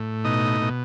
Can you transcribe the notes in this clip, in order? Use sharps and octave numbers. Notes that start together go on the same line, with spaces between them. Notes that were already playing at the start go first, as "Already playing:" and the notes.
Already playing: A2
B2 D#4 D#5
B2